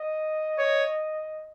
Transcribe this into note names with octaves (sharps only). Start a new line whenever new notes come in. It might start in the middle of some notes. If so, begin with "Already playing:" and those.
Already playing: D#5
C#5